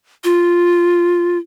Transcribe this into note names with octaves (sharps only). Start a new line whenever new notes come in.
F4